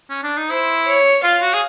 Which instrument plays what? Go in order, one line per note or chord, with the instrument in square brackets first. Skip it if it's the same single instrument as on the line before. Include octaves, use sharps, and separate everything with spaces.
[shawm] C#4
D4
D#4
[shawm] E4 [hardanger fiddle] C5
[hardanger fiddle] C#5
[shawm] F4 [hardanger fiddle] F5
[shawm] F#4
G#4